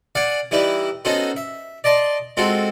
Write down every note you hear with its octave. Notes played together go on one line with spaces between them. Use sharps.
D5 F5 F#5 G#5
E3 G3 D#4 E4 B4
B3 C#4 D#4 F#4 A4 C5
E5
D5 D#5 A5 C6
G#3 C4 F4 F#4 A4